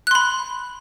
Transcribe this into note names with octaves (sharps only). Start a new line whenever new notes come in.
B5 C6 F#6